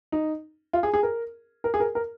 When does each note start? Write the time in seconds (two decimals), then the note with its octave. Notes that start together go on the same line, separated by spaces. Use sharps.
0.12 D#4
0.73 F4
0.83 G#4
0.94 G#4
1.03 A#4
1.64 A#4
1.74 G#4
1.80 A#4
1.95 A#4